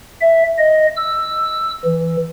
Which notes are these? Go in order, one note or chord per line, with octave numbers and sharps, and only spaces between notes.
E5
D#5
E6
E3